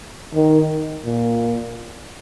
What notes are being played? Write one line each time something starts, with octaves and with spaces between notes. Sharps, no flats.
D#3
A#2